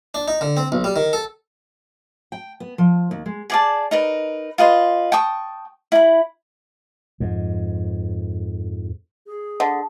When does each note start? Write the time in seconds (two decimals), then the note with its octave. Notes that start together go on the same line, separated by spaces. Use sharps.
0.14 D4
0.28 D#4
0.41 D3
0.57 C4
0.72 B1
0.84 G3
0.96 D#3
1.13 A4
2.32 G5
2.60 B3
2.78 F3
3.11 D#2
3.26 G#3
3.50 G#4 D5 A5
3.91 D#4 A#4 B4
4.58 F4 B4 D#5 C6
5.12 G5 A5 C#6 D#6
5.92 E4 B5
7.20 F2 G#2
9.26 G#4
9.60 D3